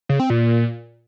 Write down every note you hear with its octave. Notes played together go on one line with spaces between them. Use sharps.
C#3
C4
A#2